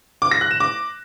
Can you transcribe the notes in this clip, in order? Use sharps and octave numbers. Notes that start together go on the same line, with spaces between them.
D6
A#6
F#6
E7
D6